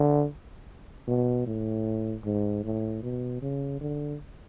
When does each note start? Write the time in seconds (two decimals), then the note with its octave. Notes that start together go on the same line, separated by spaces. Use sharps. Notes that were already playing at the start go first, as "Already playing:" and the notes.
Already playing: D3
1.07 B2
1.47 A2
2.25 G#2
2.64 A2
3.03 B2
3.42 C#3
3.81 D3